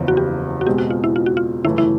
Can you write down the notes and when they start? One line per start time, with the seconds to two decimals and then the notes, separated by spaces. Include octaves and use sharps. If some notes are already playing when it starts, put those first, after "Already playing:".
Already playing: F#1 E2 C#3 F3
0.08 F#4
0.17 G4
0.61 F#4
0.67 B2 G#3 C4 G4
0.78 F#4
0.90 F4
1.04 E4
1.16 F4
1.26 F#4
1.37 F4
1.65 G1 F#2 C#3 E3 A3 E4
1.78 E4